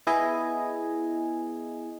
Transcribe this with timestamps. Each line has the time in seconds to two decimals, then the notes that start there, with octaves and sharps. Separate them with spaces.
0.07 B3 E4 G#4 D#5 G#5